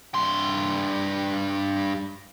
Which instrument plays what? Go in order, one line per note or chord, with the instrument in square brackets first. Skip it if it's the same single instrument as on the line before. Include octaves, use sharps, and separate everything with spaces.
[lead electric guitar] G2 C6